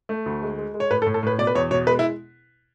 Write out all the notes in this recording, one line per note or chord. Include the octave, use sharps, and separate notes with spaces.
A3
D2
G#3
G#3
G#3
C#5
A2 B4
A4
A2
A4
A2 B4
B2 D5
B4
E2 C#5
B2 C#5
G#3 B4
E4